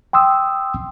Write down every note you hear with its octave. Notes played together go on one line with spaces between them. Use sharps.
G5 C6 D#6 E6